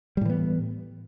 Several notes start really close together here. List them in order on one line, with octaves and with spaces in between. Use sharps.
G3 A2 E3 B3